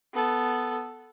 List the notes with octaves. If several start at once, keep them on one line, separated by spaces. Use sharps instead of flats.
B3 A4